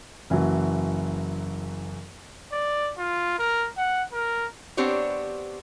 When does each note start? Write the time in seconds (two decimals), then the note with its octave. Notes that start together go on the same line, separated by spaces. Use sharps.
0.30 F#1 E3 F#3
2.52 D5
2.98 F4
3.39 A#4
3.77 F#5
4.12 A#4
4.77 B3 C4 D4 G4 C5 C#5